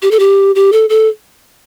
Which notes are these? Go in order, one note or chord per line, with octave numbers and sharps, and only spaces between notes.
G4
A4
G4
G4
A4
A4